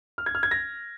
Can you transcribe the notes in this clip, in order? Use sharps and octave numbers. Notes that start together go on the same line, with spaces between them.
F6
G#6
F6
G#6
A#6